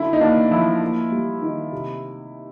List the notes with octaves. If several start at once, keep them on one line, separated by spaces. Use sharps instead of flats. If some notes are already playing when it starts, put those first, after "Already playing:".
Already playing: D3 F#3 E4
D#4
A#3 D4
F3 E4
A#3
G3
D#3
C3